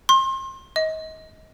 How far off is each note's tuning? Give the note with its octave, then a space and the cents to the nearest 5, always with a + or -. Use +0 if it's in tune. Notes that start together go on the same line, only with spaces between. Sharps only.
C6 +35
D#5 +30